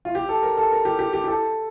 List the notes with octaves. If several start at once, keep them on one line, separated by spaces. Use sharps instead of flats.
F4
G4
A4
A#4
A4
A#4
G4
G4
G4
G4
A4